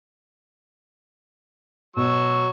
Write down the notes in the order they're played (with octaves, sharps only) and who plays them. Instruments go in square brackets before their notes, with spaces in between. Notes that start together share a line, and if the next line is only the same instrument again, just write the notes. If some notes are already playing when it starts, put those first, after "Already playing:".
[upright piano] B2 [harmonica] F#3 C#6 E6